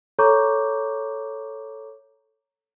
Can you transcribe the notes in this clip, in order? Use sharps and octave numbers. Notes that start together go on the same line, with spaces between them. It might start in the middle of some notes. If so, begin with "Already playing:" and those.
A4 C#5 A#5 C#6 D6 G6